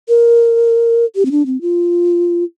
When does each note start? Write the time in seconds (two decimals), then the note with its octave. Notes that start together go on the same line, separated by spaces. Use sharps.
0.09 A#4
1.16 G4
1.25 C4
1.31 D4
1.46 C4
1.61 F4